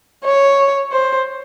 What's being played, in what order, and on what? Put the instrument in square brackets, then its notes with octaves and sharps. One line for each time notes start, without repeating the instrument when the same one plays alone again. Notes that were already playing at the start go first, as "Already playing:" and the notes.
[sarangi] C#5
C5